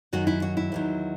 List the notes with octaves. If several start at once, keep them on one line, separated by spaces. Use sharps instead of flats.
F#2 D#3 F#3 F#4
E4
F#4
E4
E2 D#3 F#3